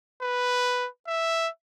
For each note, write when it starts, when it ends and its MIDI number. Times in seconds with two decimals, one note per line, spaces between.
0.22 0.88 71
1.07 1.48 76